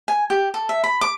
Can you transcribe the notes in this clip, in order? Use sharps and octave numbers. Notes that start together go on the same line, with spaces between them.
G#5
G4
A4
E5
B5
D6